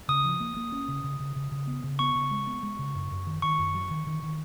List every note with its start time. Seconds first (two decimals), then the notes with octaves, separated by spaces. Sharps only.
0.08 C#3 D#6
0.24 F3
0.40 A#3
0.57 A#3
0.72 C#4
0.88 C#3
1.04 C#3
1.20 C#3
1.36 C#3
1.52 C#3
1.67 B3
1.84 C#3
1.99 B3 C#6
2.15 C#3
2.31 G#3
2.47 B3
2.63 G#3
2.79 C#3
2.95 F#2
3.11 F#2
3.27 D#3
3.42 D#3 C#6
3.59 F#2
3.75 F#3
3.90 D#3
4.07 D#3
4.22 D#3